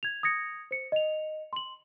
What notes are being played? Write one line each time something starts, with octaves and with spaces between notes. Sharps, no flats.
G#6 F7
D#6 G#6 A#6 C#7
C5 C#7
D#5 F7
C6 F#7